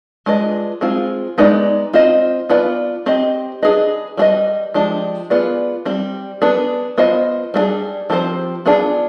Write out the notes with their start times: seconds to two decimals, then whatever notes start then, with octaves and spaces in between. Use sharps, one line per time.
0.26 G#3 D4 F4 B4 D#5
0.81 G#3 C4 F4 G#4
1.38 G#3 B3 D#4 B4 D5
1.93 C4 F4 C5 D#5
2.50 B3 F4 B4 D5
3.06 C4 G4 C5 D#5
3.63 D4 G#4 B4 D#5
4.17 G3 D4 G#4 B4 D#5
4.74 F3 G#3 D4 G4
5.30 B3 F4 G#4 B4 D5
5.85 G3 C4 G4
6.42 B3 D4 G#4 B4
6.98 B3 F4 C5 D#5
7.54 G3 B3 D4 G#4
8.10 F3 C4 G4 C5
8.66 B3 D4 F4 G#4